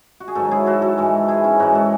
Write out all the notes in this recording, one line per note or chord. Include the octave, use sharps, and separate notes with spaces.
F#4
G#4
G#2 D#3 F#3 F#4 A4
E4 G#4
F#4 A4
F#4 A4
G#2 E3 G#3
E4 G#4
C#4 E4
G#2 E3 G#3 D#4 F#4
F#4 A4